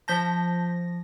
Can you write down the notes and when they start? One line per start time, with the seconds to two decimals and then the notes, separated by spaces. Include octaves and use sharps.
0.08 F3 A5 G6 A#6 B6